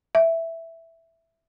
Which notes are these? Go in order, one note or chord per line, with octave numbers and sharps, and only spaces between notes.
E5